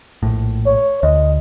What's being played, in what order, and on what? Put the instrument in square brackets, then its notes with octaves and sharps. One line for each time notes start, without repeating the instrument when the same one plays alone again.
[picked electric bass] A#1 A2
[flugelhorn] C#5
[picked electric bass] D2 [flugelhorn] D#5